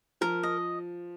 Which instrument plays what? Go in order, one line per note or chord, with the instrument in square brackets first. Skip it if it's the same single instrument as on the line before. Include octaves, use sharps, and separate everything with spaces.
[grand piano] F3 [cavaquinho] A#4
[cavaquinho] D#5